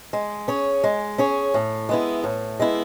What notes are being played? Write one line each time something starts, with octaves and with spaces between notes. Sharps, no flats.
G#3
C#4 G#4 C#5
G#3
C#4 G#4 C#5
A2
G#3 B3 E4
A2
G#3 B3 E4